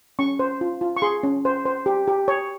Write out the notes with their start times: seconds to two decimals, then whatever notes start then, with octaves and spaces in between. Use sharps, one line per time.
0.19 C#4 C#6
0.39 C5
0.61 F4
0.81 F4
0.97 C#6
1.02 G#4 C6
1.23 C#4
1.45 C5
1.65 C5
1.86 G4
2.08 G4
2.28 C#5